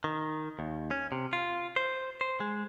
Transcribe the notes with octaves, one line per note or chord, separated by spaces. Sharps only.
D#3
D#2
C#4
C3
F4
C5
C5
G#3